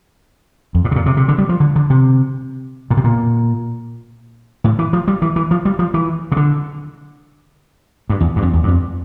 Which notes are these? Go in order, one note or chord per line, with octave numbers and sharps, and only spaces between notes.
F2
A2
C3
A#2
C3
C3
D3
G3
F3
D3
D3
C3
A#2
C3
A#2
A2
E3
F3
G3
E3
E3
F3
G3
F3
E3
C3
D3
G2
E2
G2
F2
E2
G2
F2